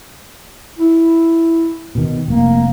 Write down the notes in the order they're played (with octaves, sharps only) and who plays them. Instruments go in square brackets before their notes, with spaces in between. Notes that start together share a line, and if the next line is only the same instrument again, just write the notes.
[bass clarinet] E4
[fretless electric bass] B2 D#3
[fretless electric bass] F1 [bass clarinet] A#3